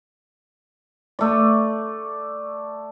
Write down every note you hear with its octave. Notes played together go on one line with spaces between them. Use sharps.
A3 D5